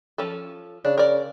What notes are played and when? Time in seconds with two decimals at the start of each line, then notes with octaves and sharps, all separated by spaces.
0.18 F3 C#4 A4
0.85 C#3 D4
0.98 A#4 D5